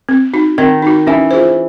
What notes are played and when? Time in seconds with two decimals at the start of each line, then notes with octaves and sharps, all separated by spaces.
0.09 C4
0.34 D#4 F#4
0.58 D#3 C4
0.82 D#4 F#4
1.07 E3 C#4
1.31 F4 G#4 C5